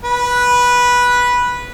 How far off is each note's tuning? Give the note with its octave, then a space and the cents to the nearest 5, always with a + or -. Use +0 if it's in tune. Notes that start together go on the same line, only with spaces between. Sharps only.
B4 -10